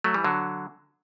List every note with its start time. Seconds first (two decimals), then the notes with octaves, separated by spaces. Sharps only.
0.04 F#3 A3
0.14 E3 G3
0.24 D3 F#3